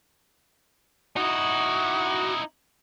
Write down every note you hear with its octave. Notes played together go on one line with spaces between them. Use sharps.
D#4 E4 F#4 D#6